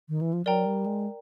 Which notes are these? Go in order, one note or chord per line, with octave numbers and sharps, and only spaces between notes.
D#3
E3
F3
F#3 A#4 D5 G5 A#5
G3
G#3